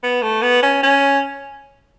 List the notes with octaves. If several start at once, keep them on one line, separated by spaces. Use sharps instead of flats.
B3
A3
B3
C#4
C#4